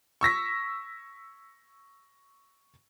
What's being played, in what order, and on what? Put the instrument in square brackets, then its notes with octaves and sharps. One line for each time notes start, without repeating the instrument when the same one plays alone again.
[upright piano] C#6 E6 A#6 B6